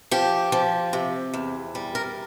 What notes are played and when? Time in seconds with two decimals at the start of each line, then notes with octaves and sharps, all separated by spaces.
0.11 F3 G4
0.52 F3
0.93 C3
1.34 E2
1.75 G3
1.95 A#4